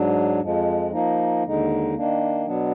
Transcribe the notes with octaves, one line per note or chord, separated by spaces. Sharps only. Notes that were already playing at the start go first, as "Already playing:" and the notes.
Already playing: G#2 F#3 D4
F2 F3 G#3
F3 A#3 D#4
D#2 D3 G#3 D#4
D#3 A#3 D4
B2 F#3 B3 D4